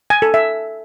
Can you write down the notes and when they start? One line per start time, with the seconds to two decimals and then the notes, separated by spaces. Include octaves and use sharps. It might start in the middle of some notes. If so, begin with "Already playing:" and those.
0.10 G#5
0.22 A4
0.34 E5